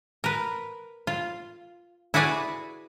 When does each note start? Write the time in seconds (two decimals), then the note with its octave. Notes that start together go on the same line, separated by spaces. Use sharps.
0.24 A#4 B4
1.07 F4
2.14 E4 F#4 G#4 B4 D5 G#5